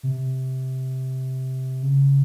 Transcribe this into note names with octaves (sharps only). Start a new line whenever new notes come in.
C3
C#3